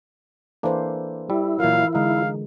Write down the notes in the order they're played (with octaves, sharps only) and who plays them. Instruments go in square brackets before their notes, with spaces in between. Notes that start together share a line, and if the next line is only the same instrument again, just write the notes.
[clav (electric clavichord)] E3 A#3 D4 [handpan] A4 C5
[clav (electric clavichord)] G3 [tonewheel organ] E4
[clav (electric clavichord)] A#2 F#3 [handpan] E3 F4 A#4 [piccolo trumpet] F5
[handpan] D3 G#3 [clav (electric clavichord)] D#4 [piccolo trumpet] F5